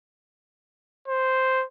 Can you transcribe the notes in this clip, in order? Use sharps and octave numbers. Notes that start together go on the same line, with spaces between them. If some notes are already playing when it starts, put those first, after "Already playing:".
C5